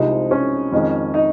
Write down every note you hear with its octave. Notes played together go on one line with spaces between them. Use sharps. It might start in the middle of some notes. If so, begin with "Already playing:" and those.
Already playing: C2 C3 F3 G#3 D#4
C#4
F2 D#3 G#3
D#4